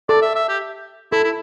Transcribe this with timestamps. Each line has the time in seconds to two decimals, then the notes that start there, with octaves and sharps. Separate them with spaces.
0.09 A4 D5
0.22 E5
0.35 E5
0.49 G4
1.12 E4 A4
1.24 E4